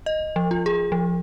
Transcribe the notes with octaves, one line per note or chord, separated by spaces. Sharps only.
D#5
F3
F4
G#4
F3